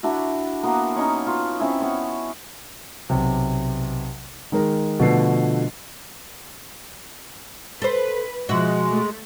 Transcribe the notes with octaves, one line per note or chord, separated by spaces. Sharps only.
D4 E4 F#4
A#3 B3 F#4
C#4 D#4 C#5
F4 B4
C4 C#4 E4
B3 C#5
B1 C3
D#3 G#3 A#4
B2 D3 F3 A3 B4 C7
A4 B4 C5
B2 F3 G#3 F#4 E5
A3